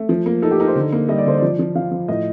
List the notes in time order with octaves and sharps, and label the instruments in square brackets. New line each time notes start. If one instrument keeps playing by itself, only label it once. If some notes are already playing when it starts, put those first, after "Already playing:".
Already playing: [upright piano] A3
F3
A#3
[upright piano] D#4 [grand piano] A4
[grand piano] G4
[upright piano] D#4 [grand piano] A#4
[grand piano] C5
[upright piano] D3
A#3
[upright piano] G3 [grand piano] D#5
[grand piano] D5
[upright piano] D3 [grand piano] C5
[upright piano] F3 [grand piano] D5
[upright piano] F3
[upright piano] F3 [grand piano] F5
[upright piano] F3
[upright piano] A2 [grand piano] D#5